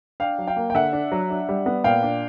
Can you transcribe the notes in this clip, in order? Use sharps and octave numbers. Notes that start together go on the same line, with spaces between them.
D4 F5 G5
F#3
F5 G5
A#3
G5
D3 E5 F#5
D4
F#3
D4
G3
B3
A#2 F5 G5
D4